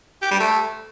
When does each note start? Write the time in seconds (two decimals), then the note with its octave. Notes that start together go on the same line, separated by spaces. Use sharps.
0.22 G4
0.31 G3
0.40 A3